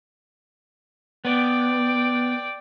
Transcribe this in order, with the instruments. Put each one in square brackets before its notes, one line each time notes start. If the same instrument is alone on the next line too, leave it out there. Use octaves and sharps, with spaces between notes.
[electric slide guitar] B3 [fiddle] D5 G5